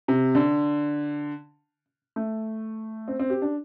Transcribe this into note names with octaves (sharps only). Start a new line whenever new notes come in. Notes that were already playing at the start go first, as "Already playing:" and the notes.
C3
D3
A3
C4
C4
G4
D4